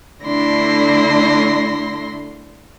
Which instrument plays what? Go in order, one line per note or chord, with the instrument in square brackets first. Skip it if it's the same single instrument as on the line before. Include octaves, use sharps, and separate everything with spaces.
[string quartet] D3 A3 D4 E4 C6 A#6